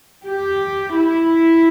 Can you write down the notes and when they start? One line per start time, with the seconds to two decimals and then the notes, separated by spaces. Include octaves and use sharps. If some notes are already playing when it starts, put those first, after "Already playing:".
0.25 G4
0.95 E4